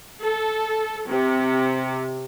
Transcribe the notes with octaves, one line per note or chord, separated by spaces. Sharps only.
A4
C3